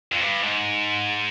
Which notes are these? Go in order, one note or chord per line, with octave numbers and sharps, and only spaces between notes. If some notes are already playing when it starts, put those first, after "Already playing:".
F2
G2
G#2